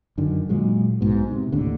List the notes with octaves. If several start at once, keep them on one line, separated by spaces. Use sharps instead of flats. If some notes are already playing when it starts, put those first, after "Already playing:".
F#2 D3 D#3
A#2 F#3 G#3
B1 G#2 B2
C3
D#2 A2 D3